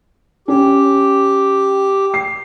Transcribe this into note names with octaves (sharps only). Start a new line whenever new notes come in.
C#4 G4
C7